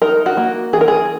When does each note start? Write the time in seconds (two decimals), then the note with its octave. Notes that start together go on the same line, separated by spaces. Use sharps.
0.02 D#4 A#4
0.26 F#4
0.37 A#3
0.73 E3 G#4
0.81 A#4
0.88 G#4